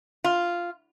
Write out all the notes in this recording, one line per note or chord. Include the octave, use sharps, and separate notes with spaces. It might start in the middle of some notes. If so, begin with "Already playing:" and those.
F4